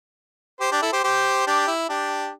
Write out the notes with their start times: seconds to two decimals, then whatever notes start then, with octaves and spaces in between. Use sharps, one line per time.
0.60 G4 C5
0.71 D4 G4
0.82 E4 A4
0.93 G4 C5
1.04 G4 C5
1.47 D4 G4
1.68 E4
1.89 D4 G4